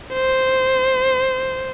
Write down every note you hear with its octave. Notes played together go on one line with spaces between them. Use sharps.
C5